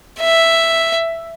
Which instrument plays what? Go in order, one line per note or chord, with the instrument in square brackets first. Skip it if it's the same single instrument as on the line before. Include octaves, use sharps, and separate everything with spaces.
[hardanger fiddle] E5